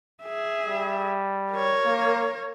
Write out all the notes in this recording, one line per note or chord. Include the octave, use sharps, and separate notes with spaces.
G#4 E5
G3
A#4 C#5
A#3